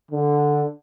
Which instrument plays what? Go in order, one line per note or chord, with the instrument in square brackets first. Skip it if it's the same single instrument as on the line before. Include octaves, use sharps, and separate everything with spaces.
[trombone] D3